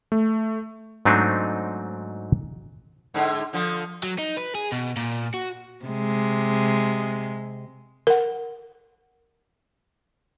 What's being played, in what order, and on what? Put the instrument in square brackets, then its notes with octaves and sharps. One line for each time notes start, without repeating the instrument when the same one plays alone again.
[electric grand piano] A3
[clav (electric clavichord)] G#2 F#3 A3 C4 D4 D#4
[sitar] G#2 D3
D3 F3
[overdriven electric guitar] F#3
D#4
B4
G#4
B2
A#2
F#4
[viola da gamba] C3 G#3
[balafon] A#4 F#5